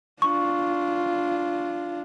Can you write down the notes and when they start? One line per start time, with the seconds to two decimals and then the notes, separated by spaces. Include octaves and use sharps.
0.22 D4 F4 C#6